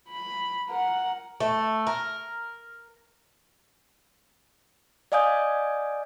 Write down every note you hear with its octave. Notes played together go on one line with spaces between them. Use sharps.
B5
A#4 F#5
A3
A#4
D5 D#5 F5 G#5 D#6 G6